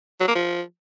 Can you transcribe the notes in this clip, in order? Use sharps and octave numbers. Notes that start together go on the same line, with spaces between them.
F#3
A#3
F3